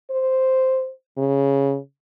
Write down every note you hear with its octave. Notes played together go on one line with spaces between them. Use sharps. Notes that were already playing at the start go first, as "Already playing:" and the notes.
C5
C#3